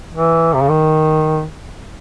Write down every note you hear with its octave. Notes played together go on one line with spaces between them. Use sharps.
E3
C3
C#3
D#3